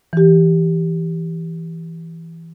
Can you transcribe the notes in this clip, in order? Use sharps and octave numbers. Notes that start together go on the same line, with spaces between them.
E3 G4